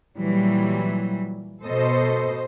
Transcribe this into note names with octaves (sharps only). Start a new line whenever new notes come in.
A#2 E3 F#3 G3
B2 A4 C5 D#5